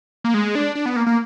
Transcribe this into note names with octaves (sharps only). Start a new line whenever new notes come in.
A#3
G#3
D4
D4
B3
A#3
A#3